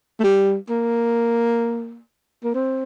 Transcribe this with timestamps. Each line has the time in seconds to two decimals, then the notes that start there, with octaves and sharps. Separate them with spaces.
0.20 A3
0.24 G3
0.70 A#3
2.44 A#3
2.54 C4